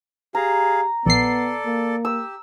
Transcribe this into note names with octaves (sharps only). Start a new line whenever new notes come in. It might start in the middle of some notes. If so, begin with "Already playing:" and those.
G4 G#4 F5 A#5
A#1 B3 A4 D5 C7
A#3
G4 E6